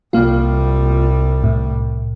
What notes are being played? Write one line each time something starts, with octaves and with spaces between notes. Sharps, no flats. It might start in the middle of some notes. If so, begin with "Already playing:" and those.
C2 G3 A#3 F4
A2